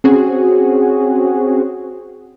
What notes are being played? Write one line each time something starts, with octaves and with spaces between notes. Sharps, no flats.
C4 C#4 F#4 G#4